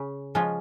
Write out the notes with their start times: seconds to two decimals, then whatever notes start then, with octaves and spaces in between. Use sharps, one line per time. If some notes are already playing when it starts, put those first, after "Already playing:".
Already playing: C#3
0.35 F3 G#3 C#4 F4